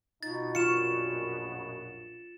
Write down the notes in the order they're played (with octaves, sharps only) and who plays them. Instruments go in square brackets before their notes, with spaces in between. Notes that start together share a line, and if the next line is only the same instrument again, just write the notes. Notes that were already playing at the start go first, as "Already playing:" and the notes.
[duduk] B2 [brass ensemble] D#4 F4 [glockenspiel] A6
[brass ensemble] A#1 F#2 A#2 [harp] F4 C#6 [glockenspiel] C#7 E7